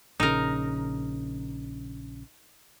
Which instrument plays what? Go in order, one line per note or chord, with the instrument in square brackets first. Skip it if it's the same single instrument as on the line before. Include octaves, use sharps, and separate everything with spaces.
[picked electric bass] A#1 C#3 [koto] D#4 A#4